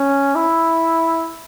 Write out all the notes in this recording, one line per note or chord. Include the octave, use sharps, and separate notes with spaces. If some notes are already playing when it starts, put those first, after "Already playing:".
Already playing: C#4
E4